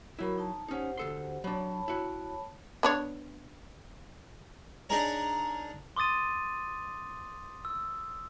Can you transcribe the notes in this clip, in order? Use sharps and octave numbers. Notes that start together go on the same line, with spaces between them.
F#3 E4 F#4 A#4 B5
D#4 A5 A#5
C#4 D#4 G4 C5 F#5
D2 A4 C6
F#3 D4 C#5 A5 B5
E4 F#4
B3 D4 C#5
D4 D#4 G#4 A#4 C#5
C6 D6 D#6 A6 D#7
E6